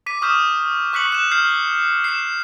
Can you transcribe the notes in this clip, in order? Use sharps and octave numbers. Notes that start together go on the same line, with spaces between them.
D6 B6 D#7
C#6 D#6 F6 G6 B6 E7
C#6 F#6 B6 C#7 F#7
F#6 E7
F6 G6 C7
C7 E7